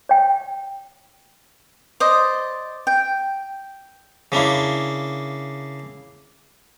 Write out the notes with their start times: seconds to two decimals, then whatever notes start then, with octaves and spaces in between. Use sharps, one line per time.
0.09 C#5 G5
2.00 C5 D5 D#5
2.87 G5
4.32 C#3 A#3 D4 E4